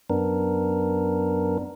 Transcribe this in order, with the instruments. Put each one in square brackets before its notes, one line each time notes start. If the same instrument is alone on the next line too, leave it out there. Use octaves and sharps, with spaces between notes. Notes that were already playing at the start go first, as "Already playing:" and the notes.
[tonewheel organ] F#2 B3 D4 A#4